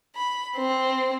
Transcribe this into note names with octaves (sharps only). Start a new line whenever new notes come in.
B5
C4